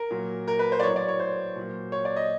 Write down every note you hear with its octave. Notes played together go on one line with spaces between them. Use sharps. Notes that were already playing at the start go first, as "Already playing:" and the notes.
Already playing: A#4
A#2 F#3
A#4
B4
C5
D5
A2 F#3 C#5
D5
C#5
C5
A#2 F#3
C#5
D5
D#5